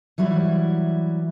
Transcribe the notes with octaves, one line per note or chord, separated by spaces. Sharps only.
E3 F#3 G3 E4